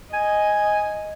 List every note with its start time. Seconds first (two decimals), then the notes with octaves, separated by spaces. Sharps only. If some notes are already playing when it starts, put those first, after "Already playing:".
0.13 D#5 G#5